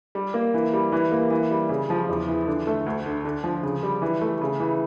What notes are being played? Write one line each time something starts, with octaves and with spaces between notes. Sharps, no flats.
G3
A#3
E3
G3
E3
A#3
E3
G3
C#3
F3
E2
E3
D3
A3
D2
D3
D3
F3
C#3
G3
E3
A3
C#3
E3